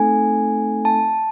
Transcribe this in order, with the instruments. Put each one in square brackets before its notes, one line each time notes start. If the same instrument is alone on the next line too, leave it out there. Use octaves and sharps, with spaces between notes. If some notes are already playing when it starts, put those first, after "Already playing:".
Already playing: [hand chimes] A3 C4 D#4 A4 G#5
A5